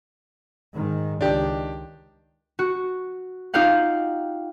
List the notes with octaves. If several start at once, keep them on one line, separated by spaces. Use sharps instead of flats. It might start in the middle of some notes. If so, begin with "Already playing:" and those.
G#2 D#3
C#2 D#3 D4 G4
F#4
D#4 F4 G4 F5 F#5